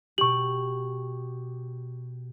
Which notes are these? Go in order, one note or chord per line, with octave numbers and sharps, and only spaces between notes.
B2 G4 C#6 F#7